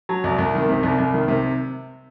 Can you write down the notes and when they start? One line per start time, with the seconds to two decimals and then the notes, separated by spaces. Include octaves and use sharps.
0.09 F#3
0.24 C2
0.38 C2
0.54 D#3
0.69 C3
0.83 C2
0.99 C2
1.14 D#3
1.28 C3